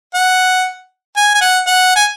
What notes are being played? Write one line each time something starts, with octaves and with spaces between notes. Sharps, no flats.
F#5
G#5
G#5
F#5
F#5
G#5